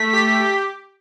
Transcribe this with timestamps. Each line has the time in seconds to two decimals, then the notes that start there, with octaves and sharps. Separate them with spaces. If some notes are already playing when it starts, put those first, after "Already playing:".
Already playing: A3 B6
0.13 G4
0.40 G4